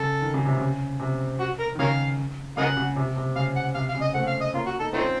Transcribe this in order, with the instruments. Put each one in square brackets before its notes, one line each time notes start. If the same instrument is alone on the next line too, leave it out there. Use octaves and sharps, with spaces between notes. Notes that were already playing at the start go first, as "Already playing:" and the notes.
Already playing: [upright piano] C#3 [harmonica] A4
[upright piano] D#3
C#3
C3
C#3
C3
[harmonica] F#4
A#4
[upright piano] D#3
[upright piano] C#3 [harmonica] A#4 C#5 F5
[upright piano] C#3 [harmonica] A#4 D#5 F#5
[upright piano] C#3
C3
C3
[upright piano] C#3 [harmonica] F5
[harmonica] F#5
[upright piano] C3 [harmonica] F5
[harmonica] F5
[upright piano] C#3
[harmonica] D#5
[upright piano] A3 C4 [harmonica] F#5
[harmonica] F5
D#5
[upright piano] A#3 C#4 [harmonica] F4
[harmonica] F#4
[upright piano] D#4 [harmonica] A4
[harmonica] D#3 A3 C4 [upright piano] C#4 F4